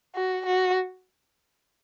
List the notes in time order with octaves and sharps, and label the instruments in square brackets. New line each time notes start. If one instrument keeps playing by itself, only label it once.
[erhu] F#4
F#4